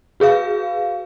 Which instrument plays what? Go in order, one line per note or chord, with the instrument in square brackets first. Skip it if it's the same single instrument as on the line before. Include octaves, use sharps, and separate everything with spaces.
[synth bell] F#4 G#4 B4 F5